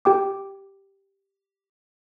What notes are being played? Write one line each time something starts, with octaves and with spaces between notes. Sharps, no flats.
G4 G5 D6